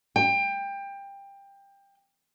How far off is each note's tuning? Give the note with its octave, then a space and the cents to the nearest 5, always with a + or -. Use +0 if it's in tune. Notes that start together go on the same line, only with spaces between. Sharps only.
G5 +20